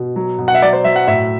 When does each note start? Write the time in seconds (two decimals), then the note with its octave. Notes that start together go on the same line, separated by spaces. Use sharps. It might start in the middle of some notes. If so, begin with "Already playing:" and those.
Already playing: B2
0.16 F#3
0.38 B2
0.48 F#5
0.55 E5
0.62 F#3 D5
0.73 C5
0.84 F#3 E5
0.96 F#5
1.07 A2 E5